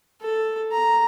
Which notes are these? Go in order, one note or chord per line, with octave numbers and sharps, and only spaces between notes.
A4
A#5